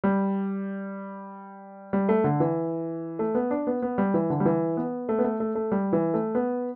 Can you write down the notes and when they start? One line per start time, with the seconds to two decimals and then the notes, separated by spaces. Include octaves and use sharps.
0.04 G3
1.93 G3
2.09 A3
2.24 D3
2.40 E3
3.19 A3
3.35 B3
3.51 D4
3.67 B3
3.82 B3
3.98 G3
4.14 E3
4.30 D3
4.40 G3
4.46 E3
4.77 B3
5.09 A3
5.19 B3
5.24 A3
5.40 A3
5.55 A3
5.72 G3
5.93 E3
6.14 A3
6.35 B3